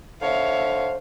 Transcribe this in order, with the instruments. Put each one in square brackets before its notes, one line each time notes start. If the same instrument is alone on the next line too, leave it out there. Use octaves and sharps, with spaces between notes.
[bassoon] D3 [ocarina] C5 [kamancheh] C#5 E5 [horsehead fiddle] F5